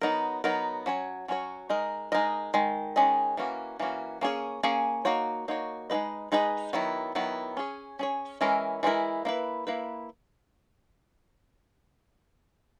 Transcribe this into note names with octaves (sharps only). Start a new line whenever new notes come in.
F#3 B3 D#4 A#4
F#3 B3 D#4 A#4
F#3 C#4 F#4 C#5
F#3 C#4 F#4 C#5
G#3 D#4 A#4 D#5
G#3 D#4 A#4 D#5
D#3 G#3
D#3 G#3 C#4 G#4 D#5
E3 A#3 C#4 F#4
E3 A#3 C#4 F#4
A#3 C#4 G#4 C#5
A#3 C#4 G#4 C#5
A#3 D#4 F#4 C#5
A#3 D#4 F#4 C#5
G#3 D#4 G#4 B4 D#5
G#3 D#4 G#4 B4 D#5
D#3 F#3 B3 E4
D#3 F#3 B3 E4
C#4 G#4 C#5
C#4 G#4 C#5
E3 G#3 C#4 E4 A#4
E3 G#3 C#4 E4 A#4
A#3 E4 B4
A#3 E4 B4